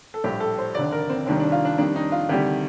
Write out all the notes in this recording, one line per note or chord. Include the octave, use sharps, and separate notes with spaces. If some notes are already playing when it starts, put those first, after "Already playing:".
A4
A#1 A2 G3 G4
A4
C5
F1 D#2 D3 D5
A#4
C4
F1 D#2 D#3 G3 D4
D4
F4
D4
F2 D#3 G3 D4
D#4
F4
D2 C3 D#3 G3 G4